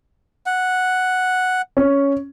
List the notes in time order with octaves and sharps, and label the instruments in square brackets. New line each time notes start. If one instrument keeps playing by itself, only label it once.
[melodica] F#5
[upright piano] C#4